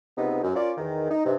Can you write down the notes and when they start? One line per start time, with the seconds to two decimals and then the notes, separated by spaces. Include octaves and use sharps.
0.18 C#2 C3 B3 D#4
0.43 F#2
0.55 C#4 F4 A#4 D5
0.78 E2 D#3
1.11 D#4
1.25 G2 C3